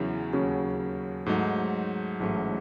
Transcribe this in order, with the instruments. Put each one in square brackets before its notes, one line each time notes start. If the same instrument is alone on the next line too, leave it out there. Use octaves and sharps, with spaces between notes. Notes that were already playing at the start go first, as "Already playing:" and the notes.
Already playing: [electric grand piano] E2 C#3 F#3 C#4 E4
D#2 C#3 F#3 C#4 F#4
G#2 F#3 A3 D#4
A1 G#2 F#3 A3